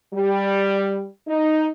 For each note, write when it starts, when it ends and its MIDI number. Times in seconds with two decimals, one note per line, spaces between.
0.14 1.05 55
1.27 1.67 63